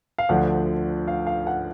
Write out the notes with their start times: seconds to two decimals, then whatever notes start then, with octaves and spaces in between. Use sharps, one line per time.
0.18 F5
0.29 D2 D3 F3 F#5
1.08 F5
1.27 F5
1.47 F#5